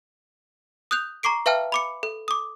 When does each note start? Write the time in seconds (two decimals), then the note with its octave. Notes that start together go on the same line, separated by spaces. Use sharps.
0.91 D#6 F#6 G6 F7
1.23 A#5 C#6 D6 C7 D7
1.46 B4 E5 F5 G5 A5 F6
1.72 B5 D6 C#7
2.03 A4
2.28 D6 D#6